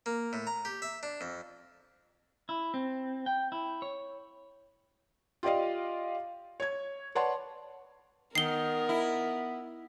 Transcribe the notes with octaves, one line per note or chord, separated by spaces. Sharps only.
A#3
A2
A#5
G4
E5
D4
F2
E4
C4
G5
E4
C#5
F4 G4 D5 D#5 F5
C#5 G#6
B4 C#5 D5 F#5 A5 C6
D#3 B3 A#4 C7 G7
E4